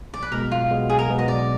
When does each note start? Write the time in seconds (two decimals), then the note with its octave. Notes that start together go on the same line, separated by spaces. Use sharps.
0.13 B1 D5
0.22 B4
0.32 B2 G#3 B3 A#4
0.51 B1 F4
0.71 B2 G#3 B3
0.89 B1 G#4
0.99 A#4
1.09 B2 G#3 B3
1.19 D#5
1.28 B1 D5